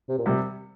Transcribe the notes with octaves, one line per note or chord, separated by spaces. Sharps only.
C3
A#2
C3 G3